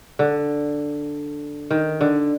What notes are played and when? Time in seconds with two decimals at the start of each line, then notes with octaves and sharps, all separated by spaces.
0.19 D3
1.71 D#3
2.01 D3